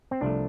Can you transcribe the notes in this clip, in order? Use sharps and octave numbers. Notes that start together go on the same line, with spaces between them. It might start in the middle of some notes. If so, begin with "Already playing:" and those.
C4
C2 C3 F3 A3 D4